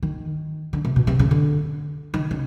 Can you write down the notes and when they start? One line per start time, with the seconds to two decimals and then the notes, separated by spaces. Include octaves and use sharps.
0.03 D#3
0.73 D3
0.85 C3
0.96 B2
1.07 C3
1.19 C#3
1.31 D3
2.14 D#3
2.31 C#3